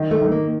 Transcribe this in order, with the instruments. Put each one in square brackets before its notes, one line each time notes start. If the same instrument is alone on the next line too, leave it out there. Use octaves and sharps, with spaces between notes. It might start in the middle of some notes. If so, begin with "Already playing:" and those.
Already playing: [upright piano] D#3
[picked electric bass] A3
[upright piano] D#3
[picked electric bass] A#3